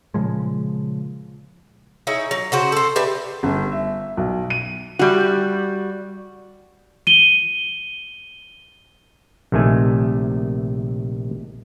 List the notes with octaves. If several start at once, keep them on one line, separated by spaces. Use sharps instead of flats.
A#2 C#3 F3 G#3
D#4 E4 G#4 C#5
F#3
C#3 F#4 C5
A4 C5
D4 G4 B4 E5
G1
E5
B1
D#7
G3 F#4
D#7 G7
A#1 C3 D#3 A3 G#5